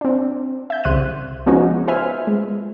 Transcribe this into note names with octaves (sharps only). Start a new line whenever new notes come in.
C4 D4
E5 G6
C2 C#3 C5 E5 F#6 D#7
F3 G#3 B3 C#4 D#4 F#4
F4 B4 C5 E5 G#5 F6
G#3